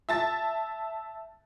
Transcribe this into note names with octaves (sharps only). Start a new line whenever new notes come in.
E5 A5 A6